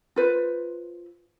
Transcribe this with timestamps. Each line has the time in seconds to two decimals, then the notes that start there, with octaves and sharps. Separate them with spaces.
0.16 F4 B4 C5